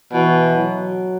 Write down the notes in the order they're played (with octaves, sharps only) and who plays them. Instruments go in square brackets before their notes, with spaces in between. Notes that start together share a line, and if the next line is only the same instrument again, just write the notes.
[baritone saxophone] B2 [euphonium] E3
[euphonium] F#3